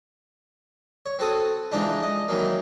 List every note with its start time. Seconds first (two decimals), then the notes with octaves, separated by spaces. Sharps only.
1.06 C#5
1.19 C4 F#4 A4 D#6
1.72 E3 F3 G#3 D4 D#4
2.03 D#5
2.28 D#3 E3 F#3 A#3